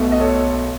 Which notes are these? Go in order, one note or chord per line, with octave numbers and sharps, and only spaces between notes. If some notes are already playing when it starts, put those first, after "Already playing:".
Already playing: B1 B2 A3
D#5
A4 C#5